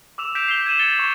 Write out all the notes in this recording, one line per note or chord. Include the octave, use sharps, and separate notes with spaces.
D6 E6 E7 F7
G6 B6 C7 D7 E7 F7
C7 G7
G#6 B6 D#7 E7 F#7
A6 C#7 G7
C#6